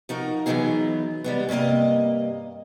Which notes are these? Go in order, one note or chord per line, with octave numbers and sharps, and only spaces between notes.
F3 D#4 F#4 A#4
E3 F#3 B3 C4 D#4 G#4
G3 G#3 B3
G2 C3 E3 A#3 D#5